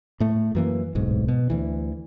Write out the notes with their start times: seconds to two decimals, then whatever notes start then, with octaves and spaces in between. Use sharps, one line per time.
0.20 A2 A3
0.55 F#2 E3 A#3
0.95 D1 B1 G#2
1.28 B2
1.50 D2 E3